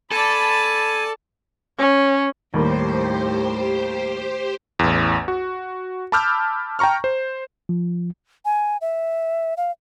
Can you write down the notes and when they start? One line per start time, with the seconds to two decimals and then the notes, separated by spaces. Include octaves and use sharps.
0.11 A4 D5 G#5 A5 B5
1.79 C#4
2.54 D#2 A2 G3 A#3 G4 C5
4.79 A1 E2
5.28 F#4
6.12 A5 B5 D6 E6 F6 G6
6.79 G5 A5 A#5 C#6 F6
7.04 C5
7.69 F3
8.45 G#5
8.81 E5
9.57 F5